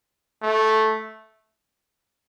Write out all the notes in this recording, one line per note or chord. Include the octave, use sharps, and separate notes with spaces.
A3